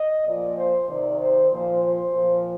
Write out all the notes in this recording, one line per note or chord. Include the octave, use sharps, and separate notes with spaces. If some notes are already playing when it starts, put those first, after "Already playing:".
Already playing: D#5
A#2 F3 D5
C5
C3 D#3 D5
C5
A#2 F3 C5
C5
A#2 F3